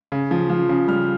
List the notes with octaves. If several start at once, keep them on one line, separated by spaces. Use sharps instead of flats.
C#3
F3
F3
C#3
G3 F6